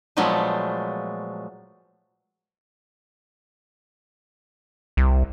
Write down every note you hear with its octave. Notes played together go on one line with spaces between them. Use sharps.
A#2 F3 F#3 G#3 A3 B3
C2